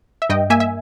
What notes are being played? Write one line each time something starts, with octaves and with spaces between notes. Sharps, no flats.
E5
G2 D#5 G5
A#3 E5 G#5
E5